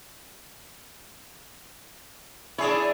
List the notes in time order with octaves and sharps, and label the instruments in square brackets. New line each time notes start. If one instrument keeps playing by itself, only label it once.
[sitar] D4 G#4 C#5 [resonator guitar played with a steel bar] E4